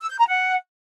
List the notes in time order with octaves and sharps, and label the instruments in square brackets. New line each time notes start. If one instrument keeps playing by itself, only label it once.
[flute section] E6
G6
A#5
F#5